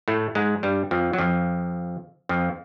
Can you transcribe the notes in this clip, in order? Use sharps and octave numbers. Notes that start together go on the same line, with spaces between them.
A2 A3
G#2 G#3
G2 G3
F2 F3
F#3
F2 F3
F2 F3